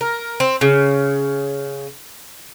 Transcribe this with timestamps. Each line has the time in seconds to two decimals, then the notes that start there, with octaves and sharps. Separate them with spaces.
0.01 A#4
0.40 C4
0.61 C#3